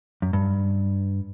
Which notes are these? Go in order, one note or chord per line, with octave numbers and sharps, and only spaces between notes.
F#2
G2